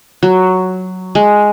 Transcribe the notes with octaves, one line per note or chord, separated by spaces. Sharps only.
F#3
G#3